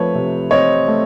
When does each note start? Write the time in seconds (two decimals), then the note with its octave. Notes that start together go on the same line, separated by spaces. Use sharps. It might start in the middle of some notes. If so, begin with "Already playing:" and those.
Already playing: F3 A3 C4 B4 C#5
0.15 C3
0.51 C4 C#5 D#5
0.88 A3